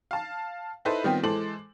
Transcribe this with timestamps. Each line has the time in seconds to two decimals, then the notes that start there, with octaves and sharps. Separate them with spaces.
0.11 F5 A5
0.85 D#4 E4 A4 B4 C5 B5
1.04 D#3 G3 B3 C4 F4 G4
1.23 E3 G#3 A4 C5 D6 F#7